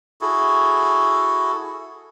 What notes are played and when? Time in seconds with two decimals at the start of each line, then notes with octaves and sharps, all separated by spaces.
0.21 E4 F#4 G#4 A4